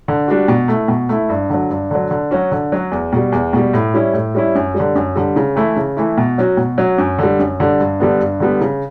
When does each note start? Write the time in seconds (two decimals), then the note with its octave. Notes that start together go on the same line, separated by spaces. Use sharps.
0.08 D3
0.28 G3 D4 F#4
0.48 B2
0.68 A3 E4
0.88 B2
1.09 A3 E4
1.29 G2
1.50 D3 F#3
1.70 G2
1.91 D3 F#3
2.11 D3
2.31 F#3 C#4 F#4
2.51 D3
2.72 F#3 C#4 F#4
2.92 E2
3.13 B2 G3
3.32 E2
3.53 B2 G3
3.73 A2
3.94 G3 C#4 E4
4.14 A2
4.35 G3 C#4 E4
4.55 F#2
4.74 G3
4.80 D3
4.95 F#2
5.16 D3 G3
5.36 C#3
5.56 E3 A3 E4
5.77 C#3
5.97 E3 A3 E4
6.18 B2
6.38 F#3 C#4 F#4
6.57 B2
6.78 F#3 C#4 F#4
6.98 F#2
7.18 D3 G3
7.39 F#2
7.60 D3 G3
7.80 G2
8.00 D3 G3 B3
8.20 G2
8.40 D3 G3 B3
8.61 C#3